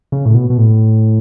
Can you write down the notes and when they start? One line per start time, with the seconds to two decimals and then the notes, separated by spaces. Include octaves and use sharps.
0.12 C#3
0.26 A2
0.35 B2
0.50 B2
0.58 A2